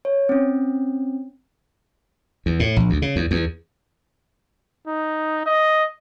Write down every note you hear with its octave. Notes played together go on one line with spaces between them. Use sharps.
C#5
C4 C#4
E2
A2
A#1
D2
C#3
E2
E2
D#4
D#5